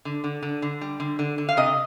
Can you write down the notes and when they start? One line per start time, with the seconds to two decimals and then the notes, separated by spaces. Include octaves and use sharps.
0.05 D3
0.24 D3
0.43 D3
0.62 D3
0.81 G3
1.00 D3
1.19 D3
1.38 D3
1.49 F5
1.57 C3 D#5